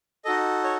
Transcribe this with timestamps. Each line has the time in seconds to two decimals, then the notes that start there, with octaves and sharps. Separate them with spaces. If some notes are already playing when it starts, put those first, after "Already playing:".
0.25 D#4 F#4 A4 D#5
0.64 C#5